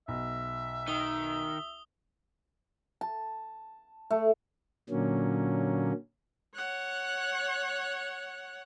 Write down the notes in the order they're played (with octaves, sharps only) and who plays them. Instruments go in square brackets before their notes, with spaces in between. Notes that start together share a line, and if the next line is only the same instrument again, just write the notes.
[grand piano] B1 [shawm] E5
[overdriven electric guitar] D#3 [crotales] D#6 G7
[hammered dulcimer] A5
A3
[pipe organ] A#2 D3 F#3 A#3 C#4
[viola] C#5 F#5